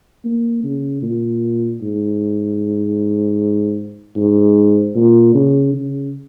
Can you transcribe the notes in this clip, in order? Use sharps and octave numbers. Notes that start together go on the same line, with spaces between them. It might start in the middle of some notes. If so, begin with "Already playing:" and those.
A#3
C#3
A#2
G#2
G#2
A#2
C#3
C#3